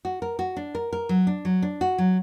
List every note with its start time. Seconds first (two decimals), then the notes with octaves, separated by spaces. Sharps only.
0.05 F#4
0.22 A#4
0.39 F#4
0.56 D4
0.75 A#4
0.93 A#4
1.09 F#3
1.27 D4
1.45 F#3
1.63 D4
1.81 F#4
1.98 F#3